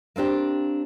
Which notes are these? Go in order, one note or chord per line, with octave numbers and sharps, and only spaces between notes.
A#3 C4 D4 G4